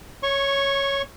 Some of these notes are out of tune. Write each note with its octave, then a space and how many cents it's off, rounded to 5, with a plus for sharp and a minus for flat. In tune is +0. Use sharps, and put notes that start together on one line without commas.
C#5 +0 C#6 -20